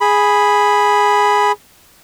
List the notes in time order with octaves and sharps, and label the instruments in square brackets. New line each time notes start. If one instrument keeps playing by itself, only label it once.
[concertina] G#4 B5